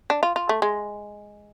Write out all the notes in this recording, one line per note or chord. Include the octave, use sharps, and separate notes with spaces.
D4
F4
F4
A3
G#3